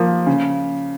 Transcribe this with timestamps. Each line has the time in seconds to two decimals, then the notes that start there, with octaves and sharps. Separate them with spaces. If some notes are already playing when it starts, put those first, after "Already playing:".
Already playing: F3 A#3
0.27 C#3